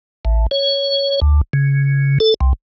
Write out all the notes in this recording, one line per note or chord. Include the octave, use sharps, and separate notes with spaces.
A1
C#5
D2
C#3
A4
C2